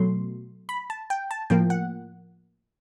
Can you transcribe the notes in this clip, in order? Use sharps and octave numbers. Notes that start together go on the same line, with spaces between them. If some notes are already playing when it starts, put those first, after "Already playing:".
Already playing: B2 F#3 A3 C6
B5
A5
G5
A5
A2 F3 A#3 G5
F#5